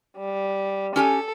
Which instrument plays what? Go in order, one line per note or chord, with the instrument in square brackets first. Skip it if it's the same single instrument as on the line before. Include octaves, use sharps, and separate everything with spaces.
[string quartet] G3
[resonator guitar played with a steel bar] C#4 G4 G#5 [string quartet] A4